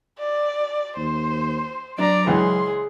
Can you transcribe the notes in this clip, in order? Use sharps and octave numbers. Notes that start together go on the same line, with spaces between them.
D5
D#2 C5
F#3 D4 D5 A#5
C#2 E3 G#4 C6